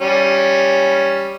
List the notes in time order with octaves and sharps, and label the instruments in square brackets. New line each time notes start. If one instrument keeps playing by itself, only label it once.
[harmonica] G3 C#4